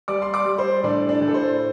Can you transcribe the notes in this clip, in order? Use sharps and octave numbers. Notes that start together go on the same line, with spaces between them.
G3 D5 D6
C6
D5 D6
G3
C5 C6
A2 D4 D5
D4 D5
A2
A4
C5